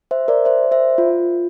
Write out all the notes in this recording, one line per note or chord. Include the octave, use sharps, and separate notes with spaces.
C5 E5
A#4 D5
C5 E5
C5 E5
F4